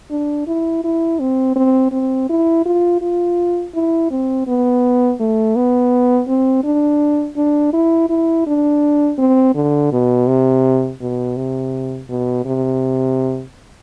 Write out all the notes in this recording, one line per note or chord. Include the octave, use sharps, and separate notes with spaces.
D4
E4
E4
C4
C4
C4
E4
F4
F4
E4
C4
B3
A3
B3
C4
D4
D4
E4
E4
D4
C4
D3
B2
C3
B2
C3
B2
C3